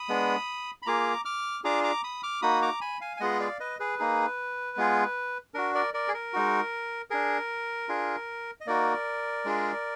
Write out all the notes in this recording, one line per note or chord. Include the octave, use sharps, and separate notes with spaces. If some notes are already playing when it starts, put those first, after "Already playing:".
Already playing: B5 D#6
G#3 B3 D4
B5
A#3 F4 G#4 A#5 D6
D6 F6
D4 F4 G#4 A#5 D6
A#5 D6
B5 D#6
D6 F6
A#3 D#4 F#4 B5 D#6
A#5 D6
G#5 B5
F5 G#5
G#5
G#3 B3 F4 G#4 D#5 F#5
D5 F5
B4 D#5
G#4 B4
A#3 D#4 G#4
G#3 B3 F4 G#4
D4 F#4 A#4
A#4 D5
A#4 D5
G#4
A#4
G#3 D#4 F#4
D4 G#4 A#4
D4 F4 G#4
D#5
A#3 D#4 F#4 A#4 D5
G#3 D4 F4 G#4